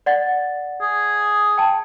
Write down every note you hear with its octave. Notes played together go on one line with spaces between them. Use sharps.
D5 F#5 A6
G#4
G5 A5